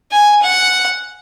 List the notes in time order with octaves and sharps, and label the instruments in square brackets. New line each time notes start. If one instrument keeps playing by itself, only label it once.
[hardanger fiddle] G#5
F#5